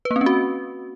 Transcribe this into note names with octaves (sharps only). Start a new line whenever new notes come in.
B4
A#3
C4
C#4
F#4